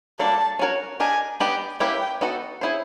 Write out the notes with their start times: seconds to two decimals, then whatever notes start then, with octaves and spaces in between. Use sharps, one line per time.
0.19 G3 A#3 D4 F#4 A4 A5
0.59 C#4 F#4 A#4 C#5
1.00 D4 G4 A#4 D#5 G#5
1.40 B3 D4 G4 B4 D#5 G5
1.80 A#3 C#4 E4 G4 B4 G5
2.21 B3 D#4 F#4 A4
2.61 C#4 E4 G#4 C5